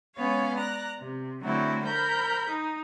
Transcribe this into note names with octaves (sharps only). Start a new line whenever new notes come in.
G#3 B3 C#4 C#5 F5
D5 A#5 F#6
C3
D3 F#3 A3 C4 E4 F#4
A#4 C5 A#5 B5 G6
D#4